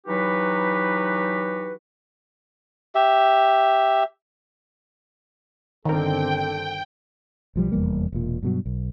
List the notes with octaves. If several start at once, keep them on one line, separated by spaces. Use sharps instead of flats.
E3 F#3 D#4 F#4 G4 B4
G4 E5
G1 D3 D#3 C4 A4 A#4 G5
B1 F3 G3
F1 E2 G3 A#3
E1 A#2
G2 B2 F#3
B1